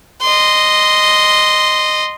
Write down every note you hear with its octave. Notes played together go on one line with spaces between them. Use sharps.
D#5 C6